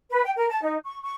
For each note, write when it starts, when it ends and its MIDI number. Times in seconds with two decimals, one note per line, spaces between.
0.10 0.22 71
0.23 0.31 79
0.36 0.46 70
0.49 0.60 81
0.62 0.75 63
0.84 0.98 85
1.01 1.14 85